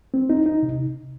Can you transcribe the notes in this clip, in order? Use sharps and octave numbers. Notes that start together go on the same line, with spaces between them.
C4
D#4
D#4
C3